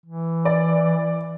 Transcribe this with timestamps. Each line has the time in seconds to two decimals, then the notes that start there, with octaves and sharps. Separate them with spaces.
0.06 E3
0.45 D5